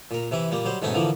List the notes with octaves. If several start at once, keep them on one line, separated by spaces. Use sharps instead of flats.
A#2 A#4
C3 E3 E4
A#2 G3 A#3
F#3 G3 C5
G#2 B2 A3 C#4 D#4
D3 E3 F3 A#3